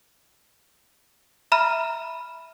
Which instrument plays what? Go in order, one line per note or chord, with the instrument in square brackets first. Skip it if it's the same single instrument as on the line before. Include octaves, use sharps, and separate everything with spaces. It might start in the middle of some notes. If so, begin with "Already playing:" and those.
[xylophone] E5 A#5 B5 F6 D#7